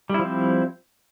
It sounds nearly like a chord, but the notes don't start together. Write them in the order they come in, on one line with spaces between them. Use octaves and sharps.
G3 E4 F3 C4